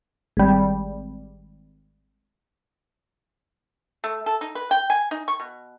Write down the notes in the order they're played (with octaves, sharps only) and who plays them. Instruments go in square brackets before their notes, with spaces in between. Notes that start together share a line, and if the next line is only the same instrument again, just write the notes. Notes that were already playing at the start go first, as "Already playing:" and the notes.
[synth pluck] G#1 G3
[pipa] A3
A4
D#4
B4
G5
G#5
D#4
C#6
B2